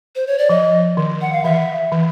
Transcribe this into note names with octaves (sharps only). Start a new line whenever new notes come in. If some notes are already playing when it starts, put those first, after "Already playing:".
C5
C#5
D5
F3 D#5
D#3
F#5
F5
E3 E5
E3